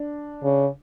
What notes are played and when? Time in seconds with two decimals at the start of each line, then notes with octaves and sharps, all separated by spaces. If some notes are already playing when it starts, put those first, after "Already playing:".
Already playing: D4
0.43 C#3